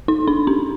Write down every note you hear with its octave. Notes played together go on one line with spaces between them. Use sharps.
D#4
D4
C#4